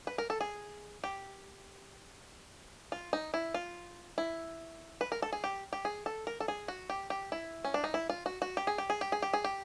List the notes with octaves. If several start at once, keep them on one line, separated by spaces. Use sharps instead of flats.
B4
A#4
A4
G#4
G4
F4
D#4
E4
F4
E4
B4
A#4
A4
G#4
G4
G4
G#4
A4
A#4
A4
G#4
F#4
G4
G4
E4
C#4
D4
D#4
E4
F4
F#4
F#4
G4
G#4
G4
G#4
G4
G#4
G4
G#4
G4